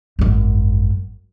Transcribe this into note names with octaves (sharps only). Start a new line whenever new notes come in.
G#1 F#2